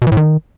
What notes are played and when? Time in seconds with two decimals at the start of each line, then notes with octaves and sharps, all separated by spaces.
0.02 B2
0.07 E3
0.12 A2
0.17 D#3